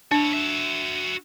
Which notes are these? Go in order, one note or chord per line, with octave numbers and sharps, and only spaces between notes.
D4 E4 C#5
F#4 E5